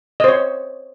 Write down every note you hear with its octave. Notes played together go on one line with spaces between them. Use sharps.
C5 C#5 D#5